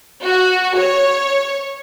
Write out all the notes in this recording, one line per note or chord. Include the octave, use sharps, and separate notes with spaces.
F#4
C#5